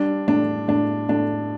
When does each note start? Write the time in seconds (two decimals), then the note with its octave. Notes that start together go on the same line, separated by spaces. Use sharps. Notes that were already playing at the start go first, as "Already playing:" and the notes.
Already playing: G3 D4
0.28 A2 D4
0.68 A2 D4
1.09 A2 D4